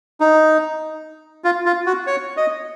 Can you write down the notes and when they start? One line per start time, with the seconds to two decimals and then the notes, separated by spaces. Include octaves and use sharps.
0.20 D#4
1.44 F4
1.66 F4
1.86 F#4
2.07 C#5
2.37 D#5